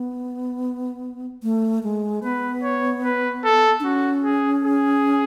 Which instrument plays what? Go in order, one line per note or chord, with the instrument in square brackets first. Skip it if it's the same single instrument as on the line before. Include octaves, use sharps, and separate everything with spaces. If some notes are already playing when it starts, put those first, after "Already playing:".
Already playing: [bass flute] B3
A3
G#3
[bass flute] B3 [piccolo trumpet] B4
[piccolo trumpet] C#5
B4
A4
[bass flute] D4
[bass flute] C#4 [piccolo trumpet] F#4
[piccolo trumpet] G#4
G#4